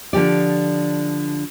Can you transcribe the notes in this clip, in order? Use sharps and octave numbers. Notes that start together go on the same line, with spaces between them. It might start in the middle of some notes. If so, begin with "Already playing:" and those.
D3 F3 G4 D5